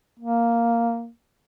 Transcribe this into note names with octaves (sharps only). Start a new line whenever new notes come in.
A#3